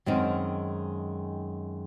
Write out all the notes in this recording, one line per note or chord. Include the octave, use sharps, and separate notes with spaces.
F#2 D#3 G#3 C4 D#4